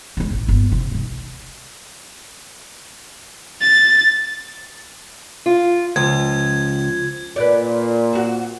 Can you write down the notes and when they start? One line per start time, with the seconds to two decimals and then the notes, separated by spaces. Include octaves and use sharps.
0.17 C#3 G#3
0.31 A1
0.48 G1 D#2
0.72 C3
0.91 C3 G3
3.62 A6
5.46 F4
5.96 C#2 F3 G#6
7.36 A#2 B4 D5
8.13 C4 F#4